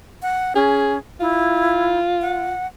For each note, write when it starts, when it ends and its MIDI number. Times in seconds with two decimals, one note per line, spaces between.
0.22 0.53 78
0.56 0.98 61
0.56 0.95 68
1.20 1.98 64
1.20 2.52 65
2.21 2.66 78